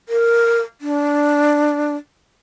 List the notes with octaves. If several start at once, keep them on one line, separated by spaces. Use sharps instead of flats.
A#4
D4